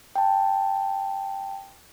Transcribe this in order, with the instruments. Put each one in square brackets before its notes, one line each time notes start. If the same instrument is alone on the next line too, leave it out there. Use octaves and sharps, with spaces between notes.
[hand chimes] G5 A5